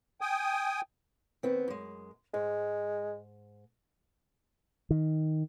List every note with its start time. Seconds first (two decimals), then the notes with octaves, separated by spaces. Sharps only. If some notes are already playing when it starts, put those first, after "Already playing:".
0.21 G5 G#5 D#6
1.43 D#2 B3 C4
1.68 F#2 G#3
2.34 G#2 G#3
4.90 D#3